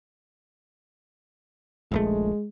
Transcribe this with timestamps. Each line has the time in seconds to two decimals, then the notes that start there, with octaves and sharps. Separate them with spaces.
1.92 D#1 A#1 G#3 A3